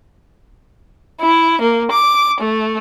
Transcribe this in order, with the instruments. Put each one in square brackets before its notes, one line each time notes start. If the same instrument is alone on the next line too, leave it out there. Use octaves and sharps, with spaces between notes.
[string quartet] E4
A#3
D6
A3